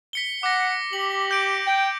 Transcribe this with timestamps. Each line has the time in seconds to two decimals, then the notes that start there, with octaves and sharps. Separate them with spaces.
0.13 B6 C#7 G7
0.43 F#5 D6 A#6
0.93 G4 F#7
1.31 G6 D7
1.67 G5